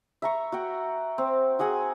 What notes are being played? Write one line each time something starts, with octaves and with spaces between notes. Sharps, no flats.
E5 A#5 C#6
F#4 F#5 G5
C4
F#4 G#4 F#5 G#5